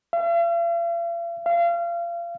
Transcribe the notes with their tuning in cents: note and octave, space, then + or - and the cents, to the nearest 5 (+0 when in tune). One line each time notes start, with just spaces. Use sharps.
F5 -45
F5 -30